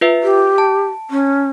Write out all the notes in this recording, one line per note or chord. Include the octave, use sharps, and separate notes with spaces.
F4 B4 E5
G4
A5
C#4